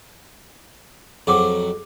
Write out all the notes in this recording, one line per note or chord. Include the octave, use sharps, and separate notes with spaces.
F2 F#3 G#4 D6